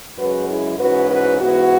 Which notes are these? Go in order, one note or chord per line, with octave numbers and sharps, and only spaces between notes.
F#2 C#3 G#3 C#4 F#4 B4
E4 G#4
G#2 E3 C#4 F#4 B4
F#4 B4
G#2 E3 B3 F#4